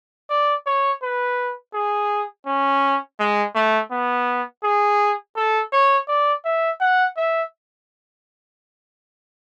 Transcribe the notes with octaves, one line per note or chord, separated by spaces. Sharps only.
D5
C#5
B4
G#4
C#4
G#3
A3
B3
G#4
A4
C#5
D5
E5
F#5
E5